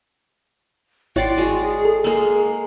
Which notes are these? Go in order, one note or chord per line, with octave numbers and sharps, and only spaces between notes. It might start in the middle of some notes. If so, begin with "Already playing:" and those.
G#1 E4 F#4 C#5 D5 G5 C6
G#3 F#4
G#4
A4
G#3 A#3 G#4